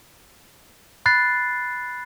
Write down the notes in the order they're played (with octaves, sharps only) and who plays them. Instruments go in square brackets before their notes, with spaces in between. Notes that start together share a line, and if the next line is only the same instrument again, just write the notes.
[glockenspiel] B5 F#6 A6 C7